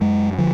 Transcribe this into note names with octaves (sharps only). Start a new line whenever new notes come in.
F#2 G#3
D3 F3